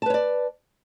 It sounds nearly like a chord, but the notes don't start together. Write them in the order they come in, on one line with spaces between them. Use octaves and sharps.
A5 B4 C#5 D5